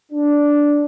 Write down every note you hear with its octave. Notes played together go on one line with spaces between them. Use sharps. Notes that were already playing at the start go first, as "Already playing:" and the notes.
D4